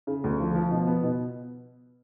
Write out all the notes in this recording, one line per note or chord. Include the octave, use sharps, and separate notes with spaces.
C#3
D2
F3
F3
B2
B3
B2